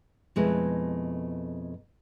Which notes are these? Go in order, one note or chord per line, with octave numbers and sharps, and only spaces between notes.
F2 B2 G#3 A3 E4 B4